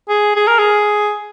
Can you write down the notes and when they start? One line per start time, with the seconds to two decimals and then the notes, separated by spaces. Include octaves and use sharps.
0.09 G#4
0.36 G#4
0.48 A#4
0.59 G#4